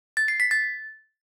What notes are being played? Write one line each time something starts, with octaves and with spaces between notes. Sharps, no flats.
A6
C7
B6
A6